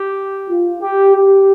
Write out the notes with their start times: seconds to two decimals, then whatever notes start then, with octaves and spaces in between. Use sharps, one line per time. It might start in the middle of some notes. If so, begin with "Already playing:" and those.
Already playing: G4
0.49 F4
0.81 G4
1.15 G4